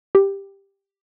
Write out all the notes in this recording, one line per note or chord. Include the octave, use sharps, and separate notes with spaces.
G4